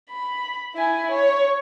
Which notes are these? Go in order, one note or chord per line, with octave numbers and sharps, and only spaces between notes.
B5
E4 G#5
C#5